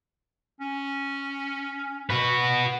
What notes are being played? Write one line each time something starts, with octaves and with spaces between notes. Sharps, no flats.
C#4
F#4 B4